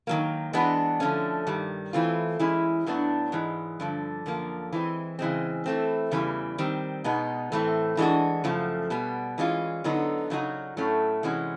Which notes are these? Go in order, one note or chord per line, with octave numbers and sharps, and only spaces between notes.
D#3 F#3 A#3
E3 G#3 B3 D4 F#4
D3 F3 A3 C#4
G2 D#3 G3
E3 A3 C4 F4
E3 G#3 C#4 E4
A2 F#3 B3 D4
G#2 E3 G#3
G2 D3 F3
F#2 D3 F3 A#3
E3 G#3 C4
C#3 E3 G#3 C4
E3 A3 C4
E2 C#3 E3 G3
D#3 G3 C4
B2 G#3 B3 D#4
A2 E3 A3 C4
E3 G#3 B3 D4 F#4
F#2 C#3 F3 A3
B2 G3 B3
E3 G#3 C#4 F4
D3 F#3 B3 D#4
C#3 F#3 B3 D#4 F#4
A2 F#3 A3 C#4
C3 E3 G#3 C#4 F#4